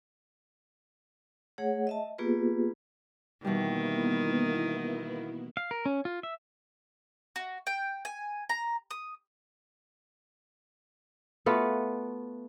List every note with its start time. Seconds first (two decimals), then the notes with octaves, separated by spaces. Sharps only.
1.58 A3 G#4 C#5 F#5
1.87 D#5 E5 A5
2.18 A#3 B3 F4 G4 G#4 B4
3.45 B2 D#3 E3 G3 A#3 B3 E4
5.57 F5
5.71 A#4
5.86 C#4
6.05 F4
6.23 E5
7.36 F#4
7.67 G5
8.05 G#5
8.49 A#5
8.91 D#6
11.46 A3 B3 F4 F#4